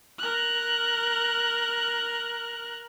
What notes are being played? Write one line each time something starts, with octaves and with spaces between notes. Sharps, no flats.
A#4 F#6